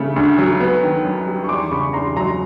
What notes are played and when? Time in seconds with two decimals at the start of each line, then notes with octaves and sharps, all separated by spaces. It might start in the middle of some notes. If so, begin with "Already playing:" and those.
Already playing: C#3 G3 A3
0.16 D2
0.38 F#3
0.60 B3
0.83 D#3
1.05 F#2
1.27 G3
1.44 C#6
1.49 E2 C6 D6
1.71 C#3 B5 C#6
1.93 E2 A#5 C6
2.16 F#3 A#5 C6